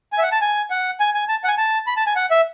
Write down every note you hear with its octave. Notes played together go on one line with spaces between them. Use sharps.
G#5
E5
F#5
A5
G#5
F#5
G#5
G#5
A5
F#5
G#5
A5
B5
A5
G#5
F#5
E5